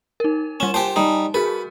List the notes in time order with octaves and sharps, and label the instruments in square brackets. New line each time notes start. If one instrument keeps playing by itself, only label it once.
[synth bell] D#4 A#4
[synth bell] G3 E7 [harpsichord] C#4
[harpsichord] G4 C5 [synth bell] G#5 A5
[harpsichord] G3 D#4
[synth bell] F#4 G#4 A#4 [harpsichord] B4